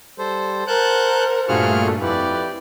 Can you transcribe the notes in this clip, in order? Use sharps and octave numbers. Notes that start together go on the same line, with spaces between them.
G3 A4 C5
A#4 C5 F#5 A5 F#6 G6
G2 A#2 A3 F4 F#4 G#4 F6
F2 E4 G4 B4 D5